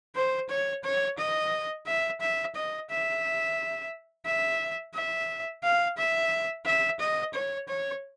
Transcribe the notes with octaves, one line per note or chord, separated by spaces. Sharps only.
C5
C#5
C#5
D#5
E5
E5
D#5
E5
E5
E5
F5
E5
E5
D#5
C#5
C#5